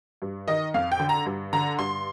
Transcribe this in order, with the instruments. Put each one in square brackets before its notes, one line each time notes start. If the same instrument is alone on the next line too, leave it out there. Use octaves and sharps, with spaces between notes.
[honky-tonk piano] G2
D#3 D#5
F2 F5
G5
D3
A#5
G2
D3 A#5
G2 C6